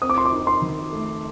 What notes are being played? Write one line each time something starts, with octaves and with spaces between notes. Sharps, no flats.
C4 D#6
D6
C6
D6
D#4
C6
D#3
A3